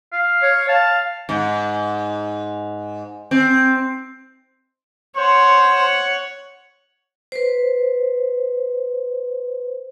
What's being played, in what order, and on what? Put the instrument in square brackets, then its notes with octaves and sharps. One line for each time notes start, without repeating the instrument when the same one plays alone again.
[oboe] F5
[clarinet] C#5
[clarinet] F5 [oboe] A5
[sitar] G#2
C4
[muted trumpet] C5 [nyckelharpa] C#5 F#5
[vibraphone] B4 C5